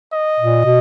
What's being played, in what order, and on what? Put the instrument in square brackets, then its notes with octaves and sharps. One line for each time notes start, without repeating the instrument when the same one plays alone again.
[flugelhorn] D#5
[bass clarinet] A#2
B2